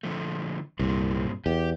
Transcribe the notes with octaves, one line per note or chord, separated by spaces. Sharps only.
D3 F3 A3
C2 G2 A#2 C4
E2 G4